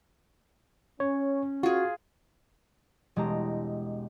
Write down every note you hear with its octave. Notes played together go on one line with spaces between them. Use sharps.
C#4 C#5
F4 F#4 G#4
E1 G#3 D4 G4 A#5